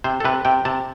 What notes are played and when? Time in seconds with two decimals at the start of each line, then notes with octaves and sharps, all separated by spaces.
0.04 C3 C5
0.20 A4
0.25 C3 B4
0.45 C3 G5
0.65 C3 A5